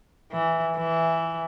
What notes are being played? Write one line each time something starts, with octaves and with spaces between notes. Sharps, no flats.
E3
E3